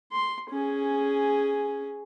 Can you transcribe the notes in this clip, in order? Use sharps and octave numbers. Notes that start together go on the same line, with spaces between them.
C6
C#4 G#4